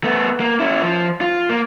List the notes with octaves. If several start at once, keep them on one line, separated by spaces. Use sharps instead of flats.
A3 B3
A#3
C#4 E4
F3
F4
A#3